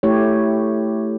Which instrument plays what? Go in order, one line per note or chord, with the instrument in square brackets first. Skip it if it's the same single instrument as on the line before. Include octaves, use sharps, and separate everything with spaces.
[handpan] A3 E4 G4 C#5